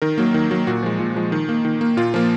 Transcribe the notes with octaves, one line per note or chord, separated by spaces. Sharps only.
D#3 A#4
F#3 A#3
D#3
F#3 A#3
A#2 F#4
F3 G#3
A#2
F3 G#3
D#3
A#3
D#3
A#3
A#2 F4
F3 A#3